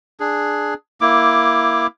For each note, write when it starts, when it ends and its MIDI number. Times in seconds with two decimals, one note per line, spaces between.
0.20 0.74 62
0.20 0.74 68
1.01 1.87 58
1.01 1.87 64
1.01 1.87 86